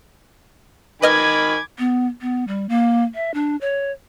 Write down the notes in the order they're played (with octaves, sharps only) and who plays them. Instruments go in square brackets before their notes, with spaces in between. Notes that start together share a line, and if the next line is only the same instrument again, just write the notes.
[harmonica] D#3 G#5 [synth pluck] B4 D#5 F6 [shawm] B5 [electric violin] D6 G#6
[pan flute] B3
B3
G3
A#3
E5
D4
C#5